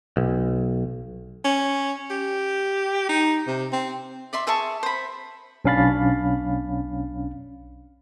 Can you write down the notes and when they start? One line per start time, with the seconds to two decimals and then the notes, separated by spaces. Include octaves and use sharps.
0.17 B1
1.45 C#4
2.11 G4
3.09 D#4
3.47 C3
3.73 C4
4.33 D5 E5 C6
4.47 G#4 E5 A5 C#6
4.83 C5 B5
5.65 B1 C#4 D4 F5 B5 A6